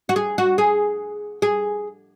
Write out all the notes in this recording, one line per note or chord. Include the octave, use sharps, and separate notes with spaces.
F#4
G#4
F#4
G#4
G#4